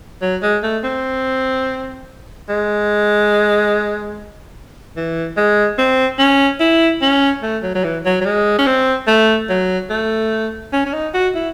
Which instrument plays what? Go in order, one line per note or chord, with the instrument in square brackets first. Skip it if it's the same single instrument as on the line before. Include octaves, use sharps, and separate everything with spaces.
[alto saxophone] F#3
G#3
A3
C4
G#3
E3
G#3
C4
C#4
E4
C#4
A3
F#3
F#3
E3
F#3
F#3
G#3
C#4
C4
A3
F#3
A3
C#4
C#4
D#4
F#4
E4